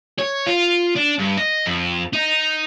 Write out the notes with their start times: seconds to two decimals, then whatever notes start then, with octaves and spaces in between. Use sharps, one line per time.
0.19 C#5
0.47 F4
0.96 D4
1.19 G2
1.37 D#5
1.66 F2
2.13 D#4